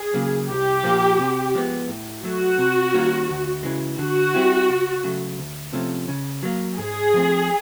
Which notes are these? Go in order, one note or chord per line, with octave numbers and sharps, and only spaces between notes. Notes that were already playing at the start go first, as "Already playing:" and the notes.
Already playing: G#4
C#3 F#3 A#3
C2 G4
A#2 F3 A#3
C3
F3 G#3 B3
A2
F#3 A3 F#4
C3
D#3 G3 A#3 C#4
D2
C#3 E3 G#3
D3 F#4
G3 C4 E4 G4
C#2
C#3 F#3 A3
D2
C3 F3 A3 C#4
C#3
F#3 A#3
G#2 G#4
F3 A3 C4